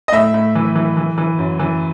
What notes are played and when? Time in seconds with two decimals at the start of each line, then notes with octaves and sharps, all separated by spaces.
0.08 D#5
0.12 A2 E5
0.34 A2
0.55 E3
0.76 E3
0.97 E3
1.18 E3
1.39 F#2
1.60 E3